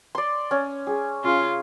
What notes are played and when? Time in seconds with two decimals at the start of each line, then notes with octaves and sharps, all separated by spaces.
0.15 D5 C6
0.51 C#4
0.87 G#4
1.24 C#3 F4